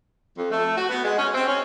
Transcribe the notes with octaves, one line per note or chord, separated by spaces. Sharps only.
F2
A3
F#4
B3
G#3
C#4
C4
C#4